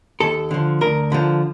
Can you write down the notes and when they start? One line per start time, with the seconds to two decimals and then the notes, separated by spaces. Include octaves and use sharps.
0.20 D#2 A4
0.51 D3 F3
0.81 D2 A#4
1.12 D3 F3